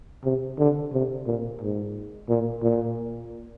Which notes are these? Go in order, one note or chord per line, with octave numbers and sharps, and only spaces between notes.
C3
D3
C3
A#2
G#2
A#2
A#2